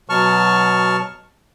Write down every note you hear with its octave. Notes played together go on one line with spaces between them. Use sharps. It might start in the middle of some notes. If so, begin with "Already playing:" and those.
B2 F#3 A5 C#6 F6